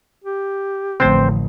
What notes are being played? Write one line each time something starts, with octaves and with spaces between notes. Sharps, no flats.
G4
A1 D3 F3 A3 C4 C5